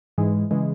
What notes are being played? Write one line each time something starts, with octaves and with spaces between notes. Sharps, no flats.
G#2 E3 G#3
C#3 E3 G#3